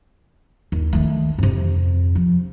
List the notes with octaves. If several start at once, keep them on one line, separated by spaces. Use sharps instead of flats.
D#2
D#3 A3
F2 C3
F3